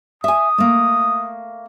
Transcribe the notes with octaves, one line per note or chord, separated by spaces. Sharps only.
E5 G#5 D#6
A3 A#3